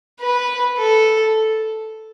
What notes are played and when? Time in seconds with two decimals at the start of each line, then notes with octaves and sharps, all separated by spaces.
0.21 B4
0.78 A4